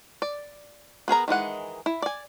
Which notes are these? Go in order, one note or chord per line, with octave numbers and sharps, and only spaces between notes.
D5
B3 G#4 A#4 A#5
D#3 E3 G#3 F#5
E4
D5 G#5